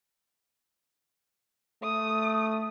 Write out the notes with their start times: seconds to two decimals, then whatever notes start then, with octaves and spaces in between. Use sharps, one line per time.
1.82 A3 D#6